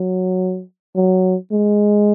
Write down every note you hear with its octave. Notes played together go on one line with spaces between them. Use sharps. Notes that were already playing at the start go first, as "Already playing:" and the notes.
Already playing: F#3
F#3
G#3